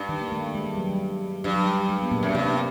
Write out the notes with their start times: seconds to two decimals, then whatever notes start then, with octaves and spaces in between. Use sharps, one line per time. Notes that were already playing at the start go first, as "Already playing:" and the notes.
Already playing: G2
0.09 D#3
0.21 A#3
0.32 A3
0.55 G#3
0.66 G3
0.78 F#3
0.89 G3
1.44 G2 F#3
1.56 F#3
1.66 G3
1.89 G#3
2.02 B3
2.11 A#2 A#3
2.23 F#2
2.34 G2 C3 C4